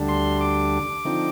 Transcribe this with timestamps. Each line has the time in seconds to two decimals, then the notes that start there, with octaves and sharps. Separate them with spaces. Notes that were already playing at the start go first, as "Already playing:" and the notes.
Already playing: D2 D3 G3 D4
0.09 C6
0.41 D6
1.05 D3 F3 C4 D#4